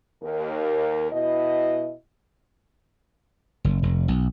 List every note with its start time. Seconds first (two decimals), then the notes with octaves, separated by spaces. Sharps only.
0.23 D#2 A#4
1.12 B2 E4 D#5
3.64 F#1
3.83 F1
4.08 B1